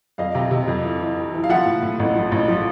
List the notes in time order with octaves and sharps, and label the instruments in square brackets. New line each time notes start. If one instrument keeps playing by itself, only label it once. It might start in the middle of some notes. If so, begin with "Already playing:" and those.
[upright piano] F2 D#5 F5
C3
C3
F2
E3
E3
E3
E3
F5
F3 E5 F#5
A2
A2
A1
F3
A1
F3